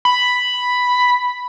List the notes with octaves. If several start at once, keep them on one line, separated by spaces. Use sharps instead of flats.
B5